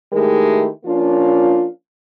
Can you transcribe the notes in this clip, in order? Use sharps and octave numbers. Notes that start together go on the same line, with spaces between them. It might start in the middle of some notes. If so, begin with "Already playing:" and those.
D#3 G#3 A3 E4 G4 A#4
F3 A#3 C#4 D4 F4